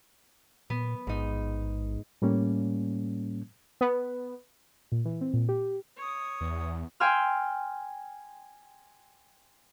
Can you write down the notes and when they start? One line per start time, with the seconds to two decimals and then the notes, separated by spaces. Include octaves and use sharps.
0.70 A#2 B3
1.07 A1 G#2 D#4
2.22 A2 G3 A#3 C#4
3.81 B3
4.92 A#2
5.05 E3
5.21 C4
5.34 A#2
5.49 G4
5.97 C#5 D#6
6.41 E2
7.00 G5 G#5 C6 E6 F6